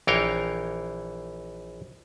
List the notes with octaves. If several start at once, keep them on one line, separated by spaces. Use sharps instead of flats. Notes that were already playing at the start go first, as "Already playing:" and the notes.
A#1 E3 A#4 C#5 F5 G5